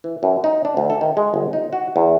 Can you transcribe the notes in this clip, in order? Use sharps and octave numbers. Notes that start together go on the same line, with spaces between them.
E3
F#2
D#4
D4
D2
A4
D#3
G#3
G1
D#4
F#4
E2